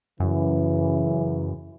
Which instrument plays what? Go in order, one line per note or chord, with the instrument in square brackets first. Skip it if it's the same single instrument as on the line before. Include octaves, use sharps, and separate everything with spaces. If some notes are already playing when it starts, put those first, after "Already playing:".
[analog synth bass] F#2 [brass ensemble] C#3 E3